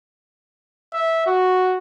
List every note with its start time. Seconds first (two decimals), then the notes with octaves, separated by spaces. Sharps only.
0.93 E5
1.26 F#4